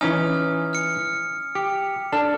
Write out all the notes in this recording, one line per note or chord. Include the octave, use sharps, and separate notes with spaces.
E3 C#4 D#4 G#5 D#6 F6
F6 C#7
G4 C#7
D4 A4 F6